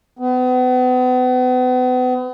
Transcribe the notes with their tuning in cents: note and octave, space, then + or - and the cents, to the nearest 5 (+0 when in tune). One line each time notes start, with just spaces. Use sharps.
B3 +40